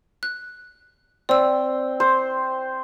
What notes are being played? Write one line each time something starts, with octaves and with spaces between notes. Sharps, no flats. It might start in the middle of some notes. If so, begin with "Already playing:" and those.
F#6
C4 D5 E6
C5